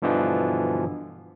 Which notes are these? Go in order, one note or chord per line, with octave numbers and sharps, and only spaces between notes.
G2 B2 D3 E3 F3